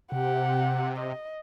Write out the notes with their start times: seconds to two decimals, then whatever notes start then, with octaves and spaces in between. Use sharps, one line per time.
0.12 C3 G4 F#5
0.97 D#5